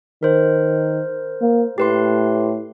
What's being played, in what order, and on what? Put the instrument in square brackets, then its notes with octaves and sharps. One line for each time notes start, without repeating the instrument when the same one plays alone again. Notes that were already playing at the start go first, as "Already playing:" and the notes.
[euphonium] D#3 [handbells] A#4 C5
[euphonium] A#3
[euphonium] A2 [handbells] G4 B4 C6